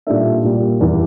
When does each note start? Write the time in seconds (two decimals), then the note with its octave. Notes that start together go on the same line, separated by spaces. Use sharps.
0.07 A#2 G3 D4 A4 E5
0.44 C2 A#2 G3 A#3
0.81 E2 E3 G3